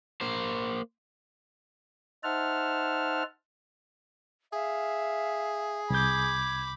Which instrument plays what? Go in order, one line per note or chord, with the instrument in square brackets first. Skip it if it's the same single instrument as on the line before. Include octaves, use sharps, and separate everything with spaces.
[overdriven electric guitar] A#3 C5
[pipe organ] D#4 C5 E5 F#5 A5 F6
[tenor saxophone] G#4 [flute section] E5 F5
[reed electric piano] C2 G6 [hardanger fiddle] B5 D6 [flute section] G#6